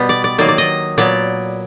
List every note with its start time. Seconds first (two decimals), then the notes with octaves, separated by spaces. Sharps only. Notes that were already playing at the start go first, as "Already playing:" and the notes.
Already playing: B2 G3 B3
0.09 D5
0.24 D5
0.38 D#3 F#3 A#3 D5
0.48 D5
0.58 D#5
0.98 A#2 F#3 B3 D5